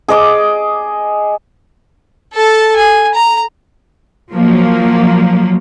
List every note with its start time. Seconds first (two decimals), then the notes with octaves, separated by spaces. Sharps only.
0.08 G#4 D#5 D6
2.34 A4 A5
2.76 G#5
3.14 A#5
4.33 F3 F#3 A#3